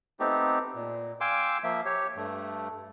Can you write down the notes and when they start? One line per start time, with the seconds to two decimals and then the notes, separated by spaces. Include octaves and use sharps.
0.20 A3 B3 C4 D#4 G4
0.75 A#2
1.21 F5 G5 G#5 C6 D6 E6
1.64 F3 A#3 E5
1.85 G4 C#5
2.17 G2 A3